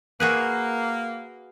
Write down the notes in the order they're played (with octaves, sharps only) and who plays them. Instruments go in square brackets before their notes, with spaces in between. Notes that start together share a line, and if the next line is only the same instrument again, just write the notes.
[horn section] A#3 [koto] F#4 G#4 B4